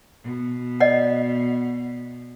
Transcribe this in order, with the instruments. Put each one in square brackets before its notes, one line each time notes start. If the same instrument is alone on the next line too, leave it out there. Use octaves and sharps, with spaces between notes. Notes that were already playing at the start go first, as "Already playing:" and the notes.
[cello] B2
[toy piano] D5 D#5 F#5